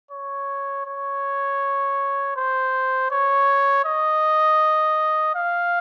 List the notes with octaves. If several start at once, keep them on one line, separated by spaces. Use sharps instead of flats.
C#5
C#5
C5
C#5
D#5
F5